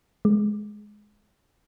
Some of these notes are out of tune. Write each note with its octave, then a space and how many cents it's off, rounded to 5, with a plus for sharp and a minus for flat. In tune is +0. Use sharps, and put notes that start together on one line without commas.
G#3 +10